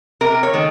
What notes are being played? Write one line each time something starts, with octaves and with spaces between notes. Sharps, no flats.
C3 A#4
C#5
D#3 A3